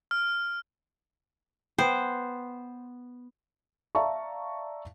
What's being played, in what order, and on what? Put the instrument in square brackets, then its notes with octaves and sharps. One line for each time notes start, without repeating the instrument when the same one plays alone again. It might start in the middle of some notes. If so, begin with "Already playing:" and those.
[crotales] F6
[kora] B3 [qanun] C5 [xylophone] G5
[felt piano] D5 E5 F5 A5 A#5 C#6